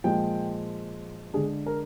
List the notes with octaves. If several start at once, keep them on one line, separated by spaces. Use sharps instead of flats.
A#2 F3 G#3 G5
D3 G#3 D4 G#4
A#4